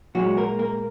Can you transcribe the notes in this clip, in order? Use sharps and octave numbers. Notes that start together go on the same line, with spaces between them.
A#2 F#3 G#3 F#4
A#3 A#4
A#3 A#4